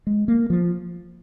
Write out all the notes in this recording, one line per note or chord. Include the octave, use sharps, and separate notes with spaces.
G#3
A#3
F3